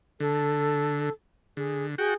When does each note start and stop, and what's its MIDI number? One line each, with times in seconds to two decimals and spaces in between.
0.20 1.10 50
0.20 1.11 69
1.57 1.95 50
1.57 1.85 68
1.98 2.14 66
1.98 2.14 68
1.98 2.14 79